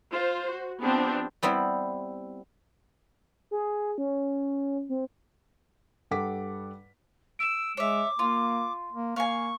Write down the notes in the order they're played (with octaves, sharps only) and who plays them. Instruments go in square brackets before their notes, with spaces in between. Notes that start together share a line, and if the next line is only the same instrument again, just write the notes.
[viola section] F4 C5
F#4
F3 B3 C4 D4 G4
[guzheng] G3 B3 C4 E4
[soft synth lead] G#4
C#4
C4
[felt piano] G2 G3 A4 F#5 D6 B6
[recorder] E6 [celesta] D7 E7
[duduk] G#3 [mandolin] C#5 E5 [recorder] D6
[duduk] A#3 [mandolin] F4 [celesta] C6
[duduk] A#3
[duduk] A#3 [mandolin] F5 G#5 [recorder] C#6